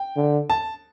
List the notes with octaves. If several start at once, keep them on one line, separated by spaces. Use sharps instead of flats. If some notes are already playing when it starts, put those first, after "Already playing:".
Already playing: G5
D3
A5